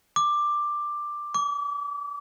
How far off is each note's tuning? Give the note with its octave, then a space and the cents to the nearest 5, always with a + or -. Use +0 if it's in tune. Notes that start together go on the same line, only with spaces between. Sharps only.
D6 +10
D6 -35